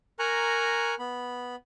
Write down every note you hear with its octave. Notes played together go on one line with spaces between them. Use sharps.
A#4 G#5 A#5 C#6 F#6
B3 B5